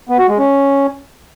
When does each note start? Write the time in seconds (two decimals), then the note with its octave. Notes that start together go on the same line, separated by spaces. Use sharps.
0.09 B3
0.19 F#4
0.29 G#3
0.38 C#4